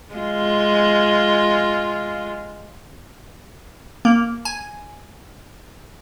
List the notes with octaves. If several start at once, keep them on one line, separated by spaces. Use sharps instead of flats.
G#3 F4
A#3
G#5